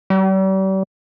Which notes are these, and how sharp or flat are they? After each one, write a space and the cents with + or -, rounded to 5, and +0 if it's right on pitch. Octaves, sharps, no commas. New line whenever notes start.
G3 -40